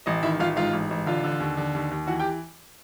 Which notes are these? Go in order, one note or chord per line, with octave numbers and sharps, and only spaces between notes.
A1 D#5
D#3 E4 E5
A1 F4 F5
G#2 F4 F5
A1
A1
D3 F4 F5
D3
D#2
D3
D#2
D#2
E3 F#4 F#5
G4 G5